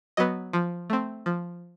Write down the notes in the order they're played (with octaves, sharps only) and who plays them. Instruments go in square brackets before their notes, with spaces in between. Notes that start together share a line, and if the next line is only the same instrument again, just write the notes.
[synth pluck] F#3 B3 D#5
F3
A3 C4
F3